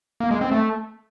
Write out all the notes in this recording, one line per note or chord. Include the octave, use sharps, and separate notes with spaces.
A#3
G#3
C4
A3